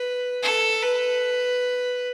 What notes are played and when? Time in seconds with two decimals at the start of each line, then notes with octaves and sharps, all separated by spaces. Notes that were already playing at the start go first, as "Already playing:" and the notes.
Already playing: B4
0.43 A4
0.82 B4